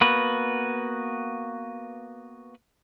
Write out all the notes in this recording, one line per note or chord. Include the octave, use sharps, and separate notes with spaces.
A#3 B3 F#4 B4